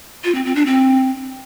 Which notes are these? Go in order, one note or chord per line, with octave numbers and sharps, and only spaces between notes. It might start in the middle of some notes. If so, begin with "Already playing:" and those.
F4
C4
C4
D4
C4